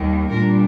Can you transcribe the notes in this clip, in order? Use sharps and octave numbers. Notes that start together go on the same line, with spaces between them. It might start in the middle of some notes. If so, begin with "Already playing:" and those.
Already playing: D#2 D#3 G3 A#3
A#2 G3 D4 A#4